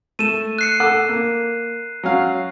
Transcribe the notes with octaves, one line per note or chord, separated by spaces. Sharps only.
A3 D#7 E7
F#6 C7 C#7
A4 F#5 D6
A#3
F#3 C#4 F5